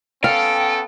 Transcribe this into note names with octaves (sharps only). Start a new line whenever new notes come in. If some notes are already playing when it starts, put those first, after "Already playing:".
B3 C#4 A4 F5 G5